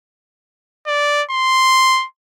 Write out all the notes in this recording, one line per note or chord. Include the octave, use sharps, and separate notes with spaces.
D5
C6